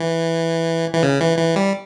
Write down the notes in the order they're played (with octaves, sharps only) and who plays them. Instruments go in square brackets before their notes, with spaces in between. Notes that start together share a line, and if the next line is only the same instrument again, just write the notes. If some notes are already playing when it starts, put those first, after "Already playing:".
Already playing: [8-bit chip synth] E3
E3
C#3
E3
E3
G3